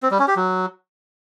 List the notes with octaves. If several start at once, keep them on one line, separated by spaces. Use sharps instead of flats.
C4
G3
C#4
G4
F#3